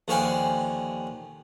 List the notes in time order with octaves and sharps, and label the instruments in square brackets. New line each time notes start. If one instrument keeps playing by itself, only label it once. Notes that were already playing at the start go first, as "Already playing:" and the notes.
[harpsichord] D#2 D3 F3 C#5 G5 G#5